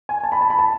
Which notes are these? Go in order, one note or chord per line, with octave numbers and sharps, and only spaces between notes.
G#5
A5
B5
A5
B5
A5